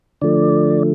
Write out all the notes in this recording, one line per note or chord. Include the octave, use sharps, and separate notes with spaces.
D3 F3 A3 D5